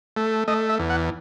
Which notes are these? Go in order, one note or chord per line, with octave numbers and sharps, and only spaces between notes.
A3
A3 D#5
E5
E2
F#5